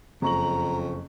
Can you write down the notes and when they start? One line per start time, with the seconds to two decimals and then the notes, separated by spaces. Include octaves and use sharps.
0.22 F#1 F2 A#5 C#6 F#7